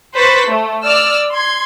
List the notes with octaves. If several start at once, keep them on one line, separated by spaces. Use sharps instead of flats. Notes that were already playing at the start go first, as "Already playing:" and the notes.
B4 C5 C#6 F#6 A6 B6
A3
D5 E6 F6
C6 G#6